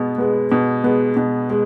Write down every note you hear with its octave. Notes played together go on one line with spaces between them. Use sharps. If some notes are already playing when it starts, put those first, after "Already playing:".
Already playing: B2 G#3 B3
G#3 B3
B2
G#3 B3
B2
G#3